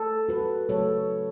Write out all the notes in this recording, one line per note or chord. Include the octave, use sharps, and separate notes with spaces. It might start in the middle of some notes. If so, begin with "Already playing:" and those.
Already playing: A4
F#4 B4
C#3 F#3 A3 A4 C#5